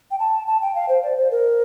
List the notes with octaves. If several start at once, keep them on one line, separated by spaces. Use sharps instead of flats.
G5
A5
A5
G5
F5
C5
D5
C5
A#4